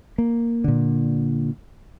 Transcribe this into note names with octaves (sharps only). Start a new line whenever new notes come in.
A#3
A#2 D3